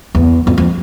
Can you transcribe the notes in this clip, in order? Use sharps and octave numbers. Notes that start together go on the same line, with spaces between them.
E2
F2
F2